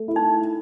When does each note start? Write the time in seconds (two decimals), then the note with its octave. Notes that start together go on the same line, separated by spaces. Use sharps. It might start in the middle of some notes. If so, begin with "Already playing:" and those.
Already playing: A3
0.08 E4
0.16 D#4